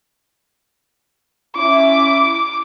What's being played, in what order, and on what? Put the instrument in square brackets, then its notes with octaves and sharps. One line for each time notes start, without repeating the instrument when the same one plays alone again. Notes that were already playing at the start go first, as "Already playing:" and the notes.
[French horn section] C#4 E4 [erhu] D6